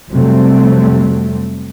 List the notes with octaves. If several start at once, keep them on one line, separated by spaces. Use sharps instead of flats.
F2 C3 F#3 G3 A3 C4